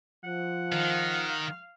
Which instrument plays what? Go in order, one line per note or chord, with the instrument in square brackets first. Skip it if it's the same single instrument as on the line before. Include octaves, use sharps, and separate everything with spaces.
[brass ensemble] F3 [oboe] F#5
[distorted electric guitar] D#3 [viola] F5